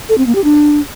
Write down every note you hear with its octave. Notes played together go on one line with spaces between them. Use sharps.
A4
C4
A#3
G4
D4